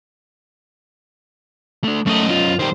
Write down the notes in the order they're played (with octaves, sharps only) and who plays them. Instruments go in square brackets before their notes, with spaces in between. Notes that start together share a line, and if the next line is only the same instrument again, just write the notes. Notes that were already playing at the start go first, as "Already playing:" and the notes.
[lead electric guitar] A3 D4
[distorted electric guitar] F#2 D#5 [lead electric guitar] A3
[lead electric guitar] F4
[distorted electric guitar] D#3 G3 [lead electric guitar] C5